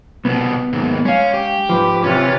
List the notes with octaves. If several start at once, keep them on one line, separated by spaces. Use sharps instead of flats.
C2 B2 B3
D#2 G#2
G#3 C#4 F5
G4
G#2 F3 B4 D6
C3 E3 C#4 F4